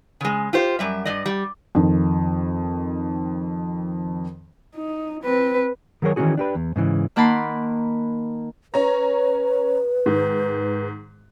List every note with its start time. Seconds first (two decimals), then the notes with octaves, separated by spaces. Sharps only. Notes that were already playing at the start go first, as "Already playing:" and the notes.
0.21 C#3 G#3
0.53 F4 G4 C5
0.79 F#2 G3 E5
1.05 G2 D5 D#5
1.26 G3
1.75 F2 D#3
4.75 D#4
5.23 C4 B4
6.02 D#3 F#3 G#4 A#4 C#5
6.16 D#3 E3 F#3 C#4 F#4 G#4
6.37 D4 G4 B4
6.55 E2
6.76 G#2 C#3 E3
7.16 D#3 A#3 F#5 A5 B5 C6
8.74 C#4 B4 C#5 A#5
10.06 G#2 D#3